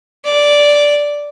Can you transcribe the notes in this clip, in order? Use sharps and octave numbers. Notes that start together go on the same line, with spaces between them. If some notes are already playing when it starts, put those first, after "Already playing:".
D5